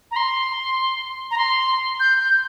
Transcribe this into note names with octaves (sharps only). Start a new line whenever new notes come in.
A#5
C6
A#5
C6
G6
G6